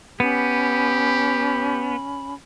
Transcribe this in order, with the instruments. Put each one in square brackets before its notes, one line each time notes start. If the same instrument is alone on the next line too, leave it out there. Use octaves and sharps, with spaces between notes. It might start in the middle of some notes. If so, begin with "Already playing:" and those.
[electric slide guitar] B3 [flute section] C#4 B5 [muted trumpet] G4